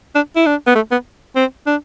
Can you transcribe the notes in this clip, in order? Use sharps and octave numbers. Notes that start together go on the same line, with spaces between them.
D4
E4
D4
B3
A3
B3
C4
D4